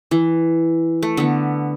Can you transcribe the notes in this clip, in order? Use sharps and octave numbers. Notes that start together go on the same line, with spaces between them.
E3
A3
D3 B3